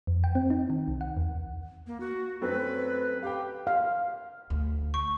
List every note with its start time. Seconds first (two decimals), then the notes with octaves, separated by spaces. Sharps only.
0.07 F2
0.24 G5
0.35 C4
0.50 D#4
0.70 D#3
0.88 C2
1.01 F#5
1.17 E2
1.87 A#3
2.00 F#4
2.41 F#2 A3 C4 B4
3.22 G4 F5 G5
3.67 F5
4.50 D2
4.94 C#6